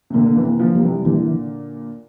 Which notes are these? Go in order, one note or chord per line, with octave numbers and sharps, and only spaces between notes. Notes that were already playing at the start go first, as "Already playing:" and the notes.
C3
A#2 D3 A#3
D3
C3 E3
A#3
D3 F3
G3
C3 E3
A#2 D3 E3